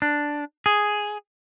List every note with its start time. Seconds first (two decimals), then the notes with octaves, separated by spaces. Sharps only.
0.02 D4
0.66 G#4